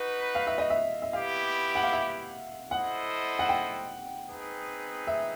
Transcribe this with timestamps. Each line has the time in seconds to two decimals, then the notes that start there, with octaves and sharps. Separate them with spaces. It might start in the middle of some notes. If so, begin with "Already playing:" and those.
Already playing: D#4 F#4 B4
0.35 F5
0.47 E5
0.58 D#5
0.70 E5
1.02 E5
1.13 B3 E4 G4 F5
1.75 F#5
1.84 F5
1.93 E5
2.71 E4 A4 C5 D#5 F#5
3.39 F#5
3.49 G5
4.28 C4 D#4 G#4 B4
5.07 E5